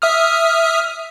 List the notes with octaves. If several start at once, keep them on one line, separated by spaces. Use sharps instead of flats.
E5 D#6 F6